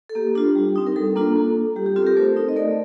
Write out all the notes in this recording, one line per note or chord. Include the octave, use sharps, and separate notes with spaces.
A4
A#3 G4
D4 F4
G3
C4 D#4
A#4
G3 A4
A#3 D4 F4
A#3
F4
G3 G4
G4
C4 F4 A4
G4 A#4
A3 A4 C5
C4 D#4
D#5
A3 A#4 D5